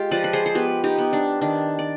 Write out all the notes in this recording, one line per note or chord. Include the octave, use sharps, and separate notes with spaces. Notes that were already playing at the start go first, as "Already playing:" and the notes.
Already playing: G#3 F4 G4
F3 B4 D5
B4
G#4 C5
C5
B3 G4 B4
D#4 G4
B3
D4
D#3 D4
D5